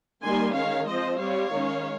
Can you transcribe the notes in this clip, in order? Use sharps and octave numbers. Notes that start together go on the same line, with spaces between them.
D#3 G3 A#3 G#5 C6
D#3 G#3 C#4 C#5 F5
F3 C4 C5 D#5
G3 C4 C#5 F5
D#3 G#3 C#4